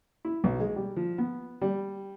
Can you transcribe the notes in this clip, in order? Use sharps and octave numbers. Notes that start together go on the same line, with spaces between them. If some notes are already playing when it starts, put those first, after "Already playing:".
E4
B1
G#3
G3
F3
B3
G3